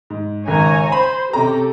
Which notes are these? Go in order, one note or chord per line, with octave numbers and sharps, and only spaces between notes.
G#2
G#1 C#3 C#5 G#5 A#5
C5 B5
C3 C#4 G4 A4 A#5